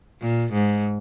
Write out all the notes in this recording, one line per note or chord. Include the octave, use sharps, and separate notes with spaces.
A#2
G#2